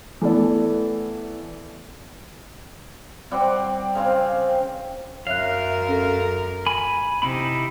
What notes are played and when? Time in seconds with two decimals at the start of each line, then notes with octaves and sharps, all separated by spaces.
0.21 E3 A3 B3 A4 D5
3.31 G3 C4 D5 F#5
3.95 C#3 C4 F5
5.27 F#2 A#4 C#5 E5 F5 F#6
5.88 C#4 A4
6.66 G#5 B5
7.22 C3 D#4 E4 B5